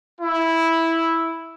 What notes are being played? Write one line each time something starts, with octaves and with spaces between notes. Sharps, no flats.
E4